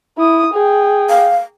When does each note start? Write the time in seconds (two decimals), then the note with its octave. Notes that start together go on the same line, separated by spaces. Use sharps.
0.18 E4 D#6
0.53 G#4 G5
1.10 F5